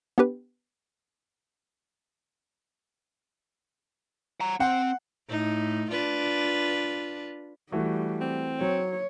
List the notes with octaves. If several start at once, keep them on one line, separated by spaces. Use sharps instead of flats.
B3 D4 G4 B4
F#5 A#5
C4 F#5
A2 D#4
D4 F4 B4
E3 G3 A3 F#4
C4
F#3 C#5